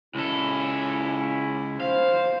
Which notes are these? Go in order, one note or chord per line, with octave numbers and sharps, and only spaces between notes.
C#2 C#4 E4 A4
C5 F5